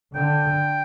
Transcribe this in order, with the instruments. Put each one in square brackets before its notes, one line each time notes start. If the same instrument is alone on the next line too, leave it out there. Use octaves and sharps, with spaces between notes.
[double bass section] D3 [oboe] G5